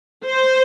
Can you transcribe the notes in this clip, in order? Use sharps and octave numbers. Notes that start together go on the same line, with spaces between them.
C5